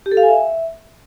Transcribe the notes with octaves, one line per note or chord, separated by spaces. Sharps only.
G4
A4
F5
G#5
E5